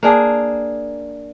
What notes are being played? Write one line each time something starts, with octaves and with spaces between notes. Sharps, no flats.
A#3 D4 G#4